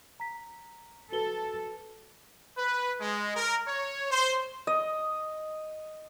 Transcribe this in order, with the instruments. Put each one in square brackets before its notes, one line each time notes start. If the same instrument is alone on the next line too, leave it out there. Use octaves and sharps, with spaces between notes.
[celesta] A#5 B6
[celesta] F#4 B4 G7 [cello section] A4
[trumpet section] B4
G#3
A#4
C#5
C5
[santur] D#5